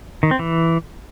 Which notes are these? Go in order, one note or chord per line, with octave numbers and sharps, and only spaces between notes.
D#3
C4
E3